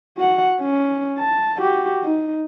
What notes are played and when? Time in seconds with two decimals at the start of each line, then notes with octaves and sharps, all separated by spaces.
0.18 F#4 F#5
0.61 C#4
1.19 A5
1.58 F#4 G4
2.04 D#4